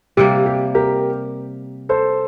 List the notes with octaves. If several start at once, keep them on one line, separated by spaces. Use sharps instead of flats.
C3 G3 A#3 G4
G4
G4 A#4
A4 C5